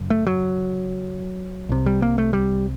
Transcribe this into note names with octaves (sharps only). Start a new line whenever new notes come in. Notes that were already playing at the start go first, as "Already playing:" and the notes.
Already playing: F#1 F#2
A3
F#3
C2 C3
G3
A#3
A3
G3